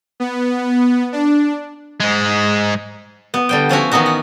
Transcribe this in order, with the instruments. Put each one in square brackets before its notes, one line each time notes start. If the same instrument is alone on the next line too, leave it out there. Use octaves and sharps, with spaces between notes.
[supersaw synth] B3
D4
[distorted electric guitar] G#2 G#3
[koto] B3
D3 G3 G5
F3 C#4 E4 F#4
D#3 E3 B3 D#4 F#4
F#5